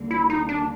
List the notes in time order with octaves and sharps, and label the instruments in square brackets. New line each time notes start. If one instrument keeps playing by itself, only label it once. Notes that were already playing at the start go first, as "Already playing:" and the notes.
Already playing: [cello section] D#2 D3 G3 A#3
[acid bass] E4
D#4
D4